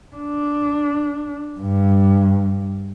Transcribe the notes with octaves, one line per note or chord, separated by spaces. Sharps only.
D4
G2